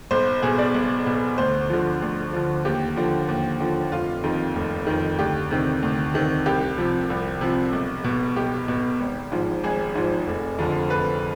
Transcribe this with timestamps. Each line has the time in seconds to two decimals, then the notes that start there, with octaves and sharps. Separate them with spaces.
0.11 B1 C5
0.42 B2 G#4
0.58 D5
0.74 B1
1.06 B2
1.38 D2 C5
1.70 D3 F3
2.02 D2
2.33 D3 F3
2.65 D#2 G4
2.97 D3 F3
3.28 D#2
3.60 D3 F3
3.92 F1 F4
4.23 F2 D#3
4.55 F1
4.87 F2 D#3
5.19 D2 G4
5.51 C3 D#3
5.82 D2
6.14 C3 D#3
6.46 C2 G4
6.78 C3 F3
7.10 C2
7.41 C3 F3
7.73 B1
8.04 B2
8.36 B1 G4
8.68 B2
9.00 G#1
9.32 G#2 F3
9.64 G#1 G#4
9.96 G#2 F3
10.27 F1
10.58 F2 D3 F3
10.90 F1 B4